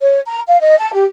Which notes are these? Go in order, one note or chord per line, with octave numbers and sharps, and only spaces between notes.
C#5
A#5
F5
D#5
A5
G4